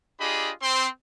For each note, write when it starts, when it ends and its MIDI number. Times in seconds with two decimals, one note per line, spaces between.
0.19 0.51 62
0.19 0.51 65
0.19 0.51 67
0.19 0.51 68
0.19 0.51 75
0.19 0.51 83
0.61 0.87 60
0.61 0.87 84